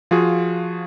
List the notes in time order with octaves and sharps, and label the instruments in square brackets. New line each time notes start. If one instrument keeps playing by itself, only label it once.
[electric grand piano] F3 F4 F#4 G#4